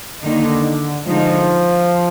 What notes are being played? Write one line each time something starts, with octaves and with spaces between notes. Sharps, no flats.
D3 D#3 A#3 D#4
D3 F3 G#3 D#4